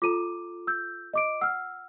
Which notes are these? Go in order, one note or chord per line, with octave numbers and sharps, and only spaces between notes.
F4 A4 A#5 D6 D#7
E6 G6
D#5 D6 D7
F#5 E6 F6